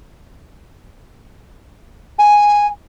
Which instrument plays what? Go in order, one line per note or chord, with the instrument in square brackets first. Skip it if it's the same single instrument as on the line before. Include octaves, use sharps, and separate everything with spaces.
[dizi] G#5